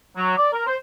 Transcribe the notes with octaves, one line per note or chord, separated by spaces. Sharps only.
F#3
D5
A#4
C5